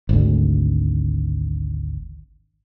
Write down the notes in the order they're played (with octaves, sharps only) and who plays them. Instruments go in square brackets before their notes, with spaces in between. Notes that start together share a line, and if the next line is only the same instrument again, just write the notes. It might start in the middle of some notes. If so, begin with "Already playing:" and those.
[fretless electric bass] G#1 D2